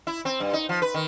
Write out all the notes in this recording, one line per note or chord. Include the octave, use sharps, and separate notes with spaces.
E4
C4
G2
D#4
F3
B4
D#3